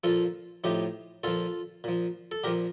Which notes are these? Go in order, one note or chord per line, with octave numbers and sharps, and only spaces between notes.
A#2 F3 F4 A4
A2 F3 D#4 G4
A#2 F3 F4 A4
A#2 F3
A4
A#2 F3 G4 A#4